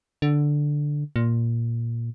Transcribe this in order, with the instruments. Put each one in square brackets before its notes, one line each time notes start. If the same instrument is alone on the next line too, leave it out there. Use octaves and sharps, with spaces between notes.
[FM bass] D3
A#2